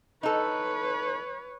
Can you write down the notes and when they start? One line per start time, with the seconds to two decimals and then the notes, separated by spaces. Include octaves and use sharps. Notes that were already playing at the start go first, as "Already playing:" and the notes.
0.23 D#4 A4 B4 C#5